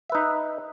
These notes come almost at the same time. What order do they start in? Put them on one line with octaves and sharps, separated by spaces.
E5 B4 D#4